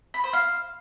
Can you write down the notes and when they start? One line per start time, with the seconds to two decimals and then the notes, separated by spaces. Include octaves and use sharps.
0.14 B5
0.24 C5
0.33 F5